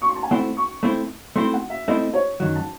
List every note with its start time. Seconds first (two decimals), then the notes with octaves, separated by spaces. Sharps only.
0.02 C#6
0.08 C6
0.16 A5
0.23 G#5
0.31 A3 C4 E4 C5 F#5
0.57 C#6
0.83 A3 C4 E4 C5
1.36 A3 C4 E4 C5 C6
1.53 F#5
1.70 E5
1.88 A3 C4 E4 C5 D#5
2.14 C#5
2.40 F#2 D#3 F#3
2.55 A5